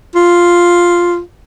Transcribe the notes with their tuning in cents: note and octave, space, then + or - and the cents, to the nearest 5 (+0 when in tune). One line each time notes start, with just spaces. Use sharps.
F4 +0